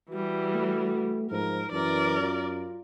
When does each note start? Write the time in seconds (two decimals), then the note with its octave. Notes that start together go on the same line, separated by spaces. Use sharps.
0.11 E3 G3 F#4
0.55 A3
1.31 G#2 F3 A#4
1.72 F#2 E3 A#4 D5
2.20 F4